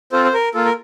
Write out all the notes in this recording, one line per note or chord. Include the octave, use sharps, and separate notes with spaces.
C4 F4 A4 C5
C5
A#4
A#3 F4 A4
A#4